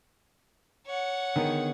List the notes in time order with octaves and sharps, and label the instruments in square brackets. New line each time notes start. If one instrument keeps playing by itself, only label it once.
[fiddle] C#5 F#5
[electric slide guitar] D3 B3 G#4 [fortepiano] D#3